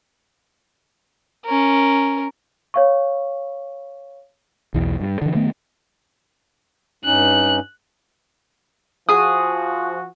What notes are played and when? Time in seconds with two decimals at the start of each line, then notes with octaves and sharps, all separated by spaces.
1.45 C#4 A#4
2.74 C#5 F5 C#6
4.74 B1 E2 E3
5.00 G2
5.22 D3 E3
5.35 D#3 A3 B3
7.05 G2 C#4 D#4 F#6
9.09 F3 F#4 G#4 D#6